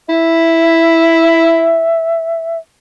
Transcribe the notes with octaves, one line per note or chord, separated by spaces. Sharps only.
E4 E5